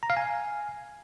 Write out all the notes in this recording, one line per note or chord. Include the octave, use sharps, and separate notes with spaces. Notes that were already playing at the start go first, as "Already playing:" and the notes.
A#5
F5
G#5